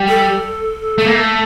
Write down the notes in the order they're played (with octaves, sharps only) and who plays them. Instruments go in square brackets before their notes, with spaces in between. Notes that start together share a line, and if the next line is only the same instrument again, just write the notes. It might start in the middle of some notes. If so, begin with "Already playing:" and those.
Already playing: [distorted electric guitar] G3
[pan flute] A4
[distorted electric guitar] A3 [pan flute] A4
[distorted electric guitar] A#3
A3